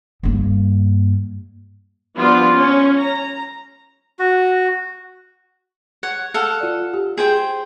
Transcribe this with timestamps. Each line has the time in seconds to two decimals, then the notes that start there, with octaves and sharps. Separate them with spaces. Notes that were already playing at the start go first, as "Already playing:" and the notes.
0.23 G2 A#3
2.17 F3 G3 B3 D4 F4
2.56 C#4
2.99 A#5
4.19 F#4
6.03 C#5 F#5
6.34 A4 F5 F#5
6.60 F4 D5
6.94 G4
7.17 G#4 C5 G5